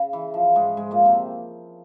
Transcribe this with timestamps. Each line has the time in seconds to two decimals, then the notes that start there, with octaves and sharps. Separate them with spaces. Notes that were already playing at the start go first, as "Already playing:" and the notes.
Already playing: C#3
0.13 E3
0.34 F3
0.56 G#2 G#3
0.77 G#2 G#3
0.91 A#2 A#3
1.05 C3 C4